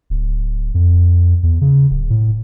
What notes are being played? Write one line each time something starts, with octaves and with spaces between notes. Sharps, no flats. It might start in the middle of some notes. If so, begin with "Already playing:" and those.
D1
F2
E2
C#3
D1
A2